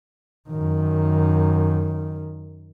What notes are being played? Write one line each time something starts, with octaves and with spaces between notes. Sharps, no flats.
F#2 D#3